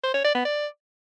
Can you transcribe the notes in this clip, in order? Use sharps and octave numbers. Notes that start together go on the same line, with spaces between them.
C5
C#5
D5
B3
D5